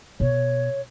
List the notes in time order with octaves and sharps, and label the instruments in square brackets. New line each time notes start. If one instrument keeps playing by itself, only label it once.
[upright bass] B2 [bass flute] C#5